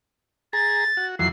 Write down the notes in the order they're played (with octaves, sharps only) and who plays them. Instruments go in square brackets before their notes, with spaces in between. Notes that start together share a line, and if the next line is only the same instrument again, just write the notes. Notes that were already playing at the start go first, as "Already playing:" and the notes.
[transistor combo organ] G#4 A#5 [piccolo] A6
[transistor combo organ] F#4
[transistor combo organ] F2 E3 F#3 [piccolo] C7